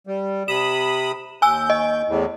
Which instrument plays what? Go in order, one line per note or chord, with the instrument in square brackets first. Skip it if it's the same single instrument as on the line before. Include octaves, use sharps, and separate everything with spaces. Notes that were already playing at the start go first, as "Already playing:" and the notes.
[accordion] G3
[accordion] C3 B5 D#6 [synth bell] E7
[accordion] D#2 G6 [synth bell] G#5 E6
[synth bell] D#5
[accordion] E2 A2